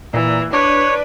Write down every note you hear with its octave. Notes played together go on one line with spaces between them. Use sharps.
A#2 E3
D4 B4 C#5